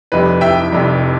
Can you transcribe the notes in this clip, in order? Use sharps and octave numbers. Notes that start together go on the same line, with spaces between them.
F1 F2 C3 G3 B4
E5 G5
F1 F2 C3 G3